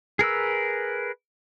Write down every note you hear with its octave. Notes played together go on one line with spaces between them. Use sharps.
G#4 A#4 B4 E6